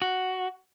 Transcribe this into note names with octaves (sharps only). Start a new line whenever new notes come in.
F#4